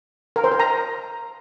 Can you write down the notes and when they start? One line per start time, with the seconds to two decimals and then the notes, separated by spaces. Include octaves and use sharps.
0.36 A#4
0.44 C5
0.52 A#4
0.60 A#5